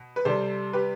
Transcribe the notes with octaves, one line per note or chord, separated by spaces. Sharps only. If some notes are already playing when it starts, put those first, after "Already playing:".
Already playing: B2
B4
C3 G3 A4 C5
G4 B4